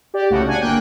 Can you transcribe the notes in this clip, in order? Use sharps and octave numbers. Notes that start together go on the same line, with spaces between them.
G4 D5
C2 A2 C#3 F#4
D4 F#5 G#5
G1 A#3 G5 F#6